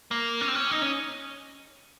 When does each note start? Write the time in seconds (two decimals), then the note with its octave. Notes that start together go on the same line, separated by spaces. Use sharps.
0.11 A#3
0.41 C#4
0.48 C4
0.55 C#4
0.71 D#4
0.82 C#4